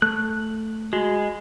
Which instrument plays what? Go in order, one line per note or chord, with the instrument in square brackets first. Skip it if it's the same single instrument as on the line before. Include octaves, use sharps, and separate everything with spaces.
[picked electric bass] A3 [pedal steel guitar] F#6
[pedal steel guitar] G#3 [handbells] F#4